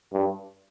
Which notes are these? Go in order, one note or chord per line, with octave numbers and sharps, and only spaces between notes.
G2